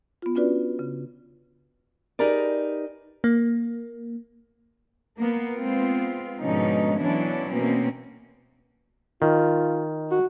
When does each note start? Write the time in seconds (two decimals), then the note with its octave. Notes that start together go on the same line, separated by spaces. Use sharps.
0.22 B3 F4
0.35 C#4 D4 F4 F#4 B4 D5
0.79 C#3
2.19 D#4 G4 G#4 A#4 B4 D5
3.24 A#3
5.19 A#3 B3
5.56 G#3 B3 C4 F4
6.41 G#2 B2 D3 F3 C#4 D#4
6.98 B2 E3 F#3 C#4 D4 E4
7.53 B2 A#3 C4 C#4
9.22 D#3 F4
10.11 F#4